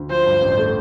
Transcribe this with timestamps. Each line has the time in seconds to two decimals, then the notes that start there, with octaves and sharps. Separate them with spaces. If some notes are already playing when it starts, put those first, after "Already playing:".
Already playing: D2
0.10 F3 C5
0.26 G2
0.42 A1
0.58 A3